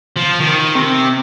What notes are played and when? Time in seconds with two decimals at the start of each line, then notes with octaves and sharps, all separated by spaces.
0.17 F3
0.41 D#3
0.76 C3